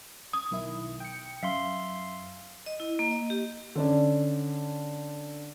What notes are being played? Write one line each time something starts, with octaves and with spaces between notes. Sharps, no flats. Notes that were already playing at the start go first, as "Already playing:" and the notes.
D#6 G#6
B1 D#3 E4
G5 C#7
F#2 E5 F5 C6
D#5
E4
A#3
D#5
G4
D3 C#4 D4